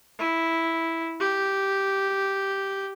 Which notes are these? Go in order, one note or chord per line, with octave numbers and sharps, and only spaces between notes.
E4
G4